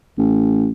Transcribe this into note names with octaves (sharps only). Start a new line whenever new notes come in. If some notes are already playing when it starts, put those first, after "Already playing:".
A1